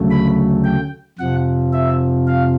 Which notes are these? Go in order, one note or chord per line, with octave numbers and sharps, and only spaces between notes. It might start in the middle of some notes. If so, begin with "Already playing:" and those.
Already playing: D2 C#3 F#3 A3
B5
G5
F2 C3 F3 F#5
E5
F5